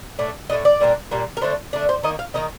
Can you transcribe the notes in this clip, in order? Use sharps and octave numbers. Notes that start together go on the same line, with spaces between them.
A2 A3 D4
A2 A3 D4 D#5
D5
A#2 G3 A#3 D4
A#2 G3 A#3 D4
A#4
D3 A3 D4 C5
D3 A3 D4
C5
D#3 A#3 D#4 D#5
F5
D#3 A#3 D#4 D#5